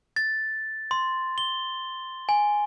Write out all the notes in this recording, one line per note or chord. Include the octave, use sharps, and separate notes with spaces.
A6
C6
G7
G#5